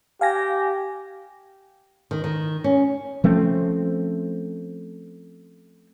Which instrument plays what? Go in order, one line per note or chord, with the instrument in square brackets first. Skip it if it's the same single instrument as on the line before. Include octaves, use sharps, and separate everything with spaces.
[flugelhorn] G4 [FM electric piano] F5 G#5 A#6
[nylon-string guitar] D#3
D#3
C#4
[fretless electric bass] F3 A3 C4 C#4